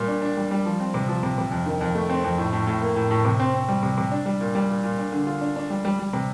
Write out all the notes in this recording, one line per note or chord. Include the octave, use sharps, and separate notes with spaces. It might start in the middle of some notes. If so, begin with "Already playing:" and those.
Already playing: A#2 G3
D4
D4
G3
G3
F3
C4
C3
F3
C3
C3
F2
D#3
F2
A3
C4
F2
A2
A2
A2
A#3
A2
A2
C3
C4
C4
G3
C3
C3
D4
G3
A#2
G3
A#2
A#2
D4
D3
F4
D4
D4
G3
G3
G3
C3